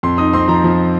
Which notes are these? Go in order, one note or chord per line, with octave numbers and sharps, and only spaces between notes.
F2 C6
D#4 D#6
C4 C6
F3 A#5
F3